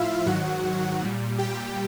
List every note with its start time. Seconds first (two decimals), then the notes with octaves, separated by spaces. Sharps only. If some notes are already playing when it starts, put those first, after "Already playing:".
Already playing: A2 F3 E4 F4 E5 F5
0.26 G#2 D#3 F#3 F#4 F#5
1.02 A#2 G3
1.38 G4 G5